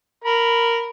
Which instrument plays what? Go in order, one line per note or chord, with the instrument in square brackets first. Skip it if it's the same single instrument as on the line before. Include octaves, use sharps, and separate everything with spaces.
[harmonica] A#4 B5